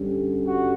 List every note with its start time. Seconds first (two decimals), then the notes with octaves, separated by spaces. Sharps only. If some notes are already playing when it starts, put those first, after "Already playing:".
Already playing: G2 D3 G3 C#4
0.45 F#4